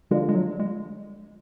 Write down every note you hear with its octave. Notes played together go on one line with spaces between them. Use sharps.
D3 F3 G#3
G#3
F#3
G#3